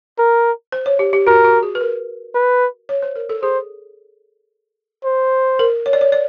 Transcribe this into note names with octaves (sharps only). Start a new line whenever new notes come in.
A#4
C5
C#5
G4
G4
F#4 A#4
F#4
G#4
B4
A#4
B4
C#5
C5
A#4
A4
G#4 C5
C5
A#4
C#5
D5
C#5
D5